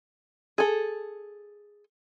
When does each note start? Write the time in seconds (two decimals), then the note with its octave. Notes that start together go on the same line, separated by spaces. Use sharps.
0.58 G#4 A4